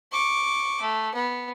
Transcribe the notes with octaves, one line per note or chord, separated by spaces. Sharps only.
C#6 D6
A3
B3